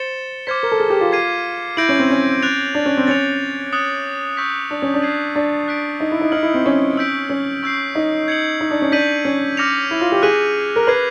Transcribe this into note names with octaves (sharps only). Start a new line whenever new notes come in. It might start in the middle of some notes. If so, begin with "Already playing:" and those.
Already playing: C5 A6 C#7 E7 G7
C5 D6 F6 G#6 B6
A#4
A4
G#4
G4
F4
G#6 C7 D#7
E4 G6 A#6 D7 F#7
C#4
C4
C#4
F#6 A6 D7 F7
D4
C#4
C4
C#4 A6 C#7 F7
D#6 F#6 A6 C#7 F#7
C#6 E6 G6 B6
D4
C#4
D4
G#6 C7 D#7 F#7
D4
F#6 B6 D7
D#4
E4
D#4
D#4 F6 G#6 C#7 F#7
E4
C4
C#4
E6 G6 B6 D7
C#4
C#6 E6 G6 C7
D#4
G#6 C#7 F#7
D#4
D4
C#4
D4 G6 B6 D#7 F#7
C#4
D6 F6 A#6 C#7 F7
E4
F4
G4
G#4 D6 F#6 B6 D#7 F#7
A#4
B4 G#6 C7 D#7 F#7